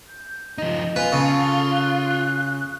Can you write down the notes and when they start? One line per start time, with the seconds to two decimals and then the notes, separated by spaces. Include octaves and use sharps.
0.08 G6
0.58 F3 D#4 D#5
0.96 F4 B4 G#5
1.12 C#3 A4
1.72 F#6